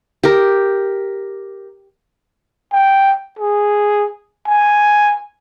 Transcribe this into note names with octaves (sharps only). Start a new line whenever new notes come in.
G4 A#4
G5
G#4
G#5